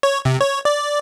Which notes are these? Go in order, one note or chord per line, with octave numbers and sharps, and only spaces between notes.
C#5
C3
C#5
D5